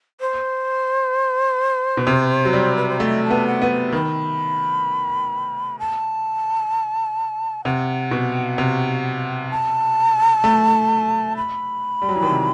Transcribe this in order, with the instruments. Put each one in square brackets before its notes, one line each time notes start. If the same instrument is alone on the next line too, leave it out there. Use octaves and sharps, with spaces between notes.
[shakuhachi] C5
[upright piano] B2
C3
F#3
G3
[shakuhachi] B4
C5
[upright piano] A3 [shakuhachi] D#5 F#5
[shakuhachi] A5
[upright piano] B3
[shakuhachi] F#5
[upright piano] B3
[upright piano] D#3 [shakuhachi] B5
[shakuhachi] A5
[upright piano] C3 [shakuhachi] F#5
[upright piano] B2
C3
[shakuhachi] A5
[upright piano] A3
[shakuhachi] B5
[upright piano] G3
F#3
E3
D#3
C3